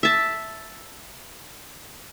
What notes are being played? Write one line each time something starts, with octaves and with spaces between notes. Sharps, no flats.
E5 A5